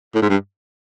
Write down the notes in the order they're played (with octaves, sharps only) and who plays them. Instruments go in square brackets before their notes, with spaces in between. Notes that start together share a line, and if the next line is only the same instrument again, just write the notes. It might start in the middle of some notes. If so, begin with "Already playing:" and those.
[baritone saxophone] A2
G#2
G2